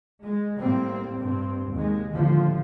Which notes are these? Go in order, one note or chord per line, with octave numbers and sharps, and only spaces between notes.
G#3
A2 G3 A#3 C4
G2 C4
D#2 D#3 G#3
D#2 A2 D3 F3